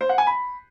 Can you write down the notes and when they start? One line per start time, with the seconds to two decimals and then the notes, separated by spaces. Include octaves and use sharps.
0.01 C5
0.09 F#5
0.18 G#5
0.27 B5